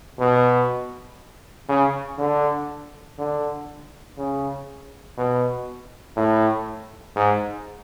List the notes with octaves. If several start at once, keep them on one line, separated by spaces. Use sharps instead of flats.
B2
C#3
D3
D3
C#3
B2
A2
G#2